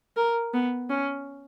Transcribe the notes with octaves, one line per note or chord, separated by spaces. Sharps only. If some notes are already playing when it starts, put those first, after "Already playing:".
A#4
B3
C#4